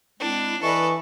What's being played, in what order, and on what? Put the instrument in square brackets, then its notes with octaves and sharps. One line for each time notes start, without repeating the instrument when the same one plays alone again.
[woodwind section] G#3 C4 E4 [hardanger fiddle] D4
[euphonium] E3 [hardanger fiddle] A4 B4 [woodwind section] D5 D#5 [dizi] C#6